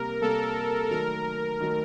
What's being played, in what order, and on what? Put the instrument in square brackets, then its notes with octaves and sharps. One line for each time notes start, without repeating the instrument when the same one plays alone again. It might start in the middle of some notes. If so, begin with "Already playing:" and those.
Already playing: [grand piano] C3 G3 A#3 [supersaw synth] A#4
[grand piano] C3 G3 A#3 [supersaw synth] A4
[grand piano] D#3 F#3 A3 [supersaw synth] A#4
[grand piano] D#3 F#3 A3